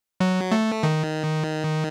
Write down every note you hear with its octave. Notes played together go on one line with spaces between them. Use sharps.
F#3
A3
D#3